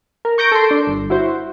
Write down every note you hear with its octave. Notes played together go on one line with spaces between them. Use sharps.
A#4
C#6 G6 A#6 D7
A4 C6
D4
G1
E4 F#4 C5